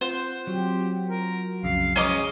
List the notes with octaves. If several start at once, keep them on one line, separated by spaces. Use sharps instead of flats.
C4 F4 C5 F#5
F#3 G4
A#4
B1 F2 C#3 F5
G#3 C#4 G#4 D#5 D6